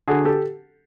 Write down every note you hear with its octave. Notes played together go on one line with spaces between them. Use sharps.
D3 F#4 G#4
G4 A4